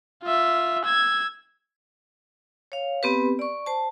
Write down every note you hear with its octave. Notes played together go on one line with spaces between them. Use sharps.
F4 E5
E6 G#6
C#5 F5
B3 C4 G4 B4
D5 C#6
C5 A5